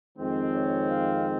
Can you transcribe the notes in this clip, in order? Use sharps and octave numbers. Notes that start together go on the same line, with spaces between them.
F2 D#3 G#3 C4
C#5
F5